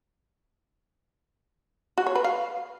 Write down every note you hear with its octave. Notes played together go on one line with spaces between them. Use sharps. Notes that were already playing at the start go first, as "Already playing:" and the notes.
F#4
C#5
B4
F5